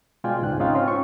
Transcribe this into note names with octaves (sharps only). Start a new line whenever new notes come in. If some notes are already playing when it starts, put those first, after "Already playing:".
B2 G#3 F4 D5 G5 G#5
C#2 G#2 F#6
C4 C#4 D#4 F4 F5 G5
C4 C#4 F4
C#6